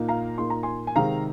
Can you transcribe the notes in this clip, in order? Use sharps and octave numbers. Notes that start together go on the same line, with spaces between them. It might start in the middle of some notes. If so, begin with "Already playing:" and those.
Already playing: A#2 A#3 D#4
F5 A#5
A#2 A#3 D#4 C6
A#5
G#5 C6
G#5
C3 D#3 G#3 F5 A#5